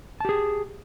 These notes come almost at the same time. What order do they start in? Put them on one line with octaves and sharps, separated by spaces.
A5 G4 G#4